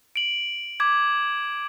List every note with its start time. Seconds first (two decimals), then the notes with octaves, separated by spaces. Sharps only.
0.16 D7 F#7
0.80 D6 G#6